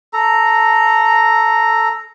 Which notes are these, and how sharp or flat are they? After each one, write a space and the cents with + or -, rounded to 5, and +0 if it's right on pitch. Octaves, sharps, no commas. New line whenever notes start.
A4 +0 A#5 -5